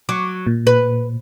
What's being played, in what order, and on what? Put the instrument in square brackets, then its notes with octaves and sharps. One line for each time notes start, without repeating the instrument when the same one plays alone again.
[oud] F#3 [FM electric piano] C#6 D6
[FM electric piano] A#2
[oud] B4